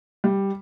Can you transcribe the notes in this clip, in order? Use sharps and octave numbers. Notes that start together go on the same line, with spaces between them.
G3